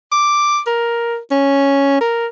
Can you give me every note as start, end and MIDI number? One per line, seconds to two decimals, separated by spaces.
0.12 0.59 86
0.67 1.17 70
1.31 1.97 61
2.01 2.27 70